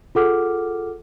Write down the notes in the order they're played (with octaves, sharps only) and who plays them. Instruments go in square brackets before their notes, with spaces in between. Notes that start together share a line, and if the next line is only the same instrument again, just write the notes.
[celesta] F4 G#4 A4 F#5 D6 F6